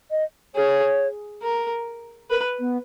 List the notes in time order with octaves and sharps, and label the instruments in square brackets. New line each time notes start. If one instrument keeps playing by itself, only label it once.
[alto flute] D#5
[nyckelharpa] G#4 [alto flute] C#5
[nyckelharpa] A#4
[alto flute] A#4 [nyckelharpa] B4
[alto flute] B3